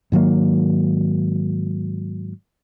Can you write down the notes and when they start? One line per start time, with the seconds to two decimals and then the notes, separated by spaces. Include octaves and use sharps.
0.12 G#2 D#3 F#3 A#3